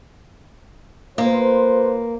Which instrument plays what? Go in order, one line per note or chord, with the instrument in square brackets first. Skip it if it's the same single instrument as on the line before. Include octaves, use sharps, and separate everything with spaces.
[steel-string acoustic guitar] A#3 [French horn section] F4 B4 C5